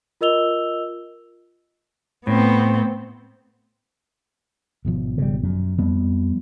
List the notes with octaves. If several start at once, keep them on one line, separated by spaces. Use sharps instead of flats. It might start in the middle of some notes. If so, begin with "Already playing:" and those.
F4 A#4 D#5 E6 F7 G7
A2 B3 C4
G#1 B2 F3
C#3 G3
F#2
F2 F3 G3 B3